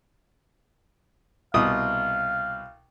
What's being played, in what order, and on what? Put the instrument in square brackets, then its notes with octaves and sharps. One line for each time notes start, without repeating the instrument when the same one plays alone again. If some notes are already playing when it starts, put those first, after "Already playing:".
[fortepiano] C2 B2 D#6 [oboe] F5